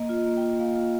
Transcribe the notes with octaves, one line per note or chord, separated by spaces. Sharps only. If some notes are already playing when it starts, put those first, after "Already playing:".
Already playing: A#3 D#5
F4
D#5
A#3
G5
F4
A#3 F5
F4